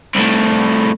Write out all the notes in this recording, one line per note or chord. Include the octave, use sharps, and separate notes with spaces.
C2 A2